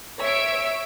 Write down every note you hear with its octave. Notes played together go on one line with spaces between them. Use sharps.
C#5 E5 E6 D7